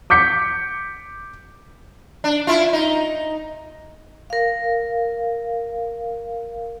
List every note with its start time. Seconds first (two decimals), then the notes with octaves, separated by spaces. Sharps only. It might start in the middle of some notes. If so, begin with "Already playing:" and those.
0.10 D6 G6 B6 C#7
2.24 D4
2.47 E4 F4
2.73 D#4
4.30 A#4 F5